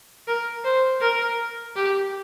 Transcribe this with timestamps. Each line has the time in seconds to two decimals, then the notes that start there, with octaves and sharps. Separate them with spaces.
0.27 A#4
0.64 C5
1.01 A#4
1.76 G4